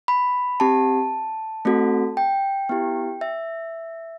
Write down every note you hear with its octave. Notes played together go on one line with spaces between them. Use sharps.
B5
C4 G4 A5
A3 C4 F#4 A4
G5
B3 E4 G4
E5